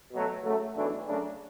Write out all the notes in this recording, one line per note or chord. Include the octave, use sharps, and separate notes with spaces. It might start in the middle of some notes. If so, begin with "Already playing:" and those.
B2 F#3 A3
C#3 F#3 A3
B1 A2 E3 A3 D4
F#2 C#3 F#3 A3 D4